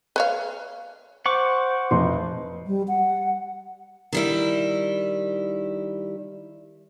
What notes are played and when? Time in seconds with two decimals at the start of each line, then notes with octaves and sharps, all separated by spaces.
0.16 B4 C#5 F5
1.26 C5 F#5 C#6 D6
1.91 F1 D#5 C6
2.67 G3
2.88 F#5
4.13 D#3 G3 E4